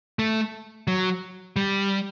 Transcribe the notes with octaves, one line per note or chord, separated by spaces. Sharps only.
A3
F#3
G3